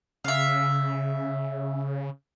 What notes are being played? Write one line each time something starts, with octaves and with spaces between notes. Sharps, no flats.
C#3 E5 F5